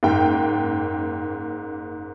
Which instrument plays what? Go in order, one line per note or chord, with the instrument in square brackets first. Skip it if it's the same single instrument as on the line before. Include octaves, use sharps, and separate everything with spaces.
[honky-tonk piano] F#1 G#2 G5